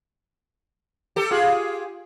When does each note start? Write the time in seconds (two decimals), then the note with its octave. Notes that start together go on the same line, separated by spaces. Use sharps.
1.16 G4 A4
1.31 F4 G4 G#4